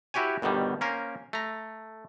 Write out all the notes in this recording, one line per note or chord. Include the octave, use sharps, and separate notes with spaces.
E4 F#4 G4 C#5 G#5
G1 B2 D3 D#3 G3
A#3 C#4 A#4 C5
A3 A#5